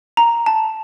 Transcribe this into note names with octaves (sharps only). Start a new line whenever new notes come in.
A#5
A5